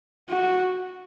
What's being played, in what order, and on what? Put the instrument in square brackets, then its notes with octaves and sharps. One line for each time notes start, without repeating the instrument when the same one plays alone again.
[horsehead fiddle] F#4